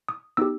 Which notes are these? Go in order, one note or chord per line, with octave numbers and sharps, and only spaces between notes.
D#6
B3 D#4 G4 E6